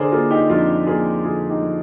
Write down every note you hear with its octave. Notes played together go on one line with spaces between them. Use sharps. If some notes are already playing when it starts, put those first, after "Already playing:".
Already playing: D3 G#4 A#4 C5 D5
A#3 F4 G#4
D#4 G4
F2 D4 F4
A#3 F4 G#4
D3 F4 G#4
D#4 G4
F3